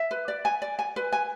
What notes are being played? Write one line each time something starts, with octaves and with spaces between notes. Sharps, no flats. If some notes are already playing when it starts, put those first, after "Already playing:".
Already playing: E5
B4
D5
G#5
D5
G#5
B4
G#5